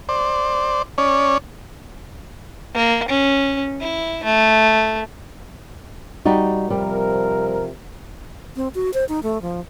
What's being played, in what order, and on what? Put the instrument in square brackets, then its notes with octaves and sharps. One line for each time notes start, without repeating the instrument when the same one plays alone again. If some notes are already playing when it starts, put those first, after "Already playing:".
[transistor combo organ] C5 D5
C#4 C#5 D5
[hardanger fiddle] A#3
C#4
E4
A3
[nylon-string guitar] G3 D#4 F#4
[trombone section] C3 F3 A#4 [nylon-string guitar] G3
[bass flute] C4
F#4
C5
D#4
A3
F3